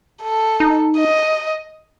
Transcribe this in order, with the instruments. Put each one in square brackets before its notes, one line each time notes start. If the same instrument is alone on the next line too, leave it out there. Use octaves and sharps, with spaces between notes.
[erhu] A4
[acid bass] D#4
[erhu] D#5